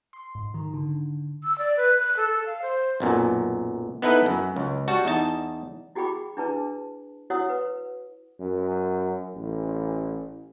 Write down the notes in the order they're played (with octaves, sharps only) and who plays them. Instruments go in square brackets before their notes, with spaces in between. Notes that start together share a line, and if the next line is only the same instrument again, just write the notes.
[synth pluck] C6
G#2
D#3
D3
[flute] E6
D5
B4
F#6
A4
A4
F5
C5
[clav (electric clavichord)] B1 F#2 A#2
B3 D#4 E4 A4 B4
F#2
C#2
G3 F#4 A5
E2 D#4 A5
[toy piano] E4 F#4 G#4 G5 B5 D6
D4 E4 G#4 B4 A5
E4 F#4 C#5 F#5 D#6 E6
B4
[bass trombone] F#2
A1